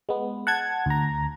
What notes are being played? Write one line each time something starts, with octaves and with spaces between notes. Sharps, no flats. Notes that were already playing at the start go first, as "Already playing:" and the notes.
G#3 B3
F#5 A5 G#6
D2 A#5